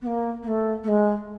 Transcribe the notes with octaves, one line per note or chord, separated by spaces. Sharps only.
B3
A#3
A#3
A3
A3
G#3